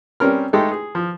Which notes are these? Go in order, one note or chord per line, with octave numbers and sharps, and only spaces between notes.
G3 C4 C#4 A#4 F6
G#3 A3 D#4 G4 A4
G#4
F3